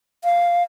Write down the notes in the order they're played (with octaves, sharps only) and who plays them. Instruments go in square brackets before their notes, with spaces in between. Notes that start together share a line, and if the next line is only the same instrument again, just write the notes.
[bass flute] F5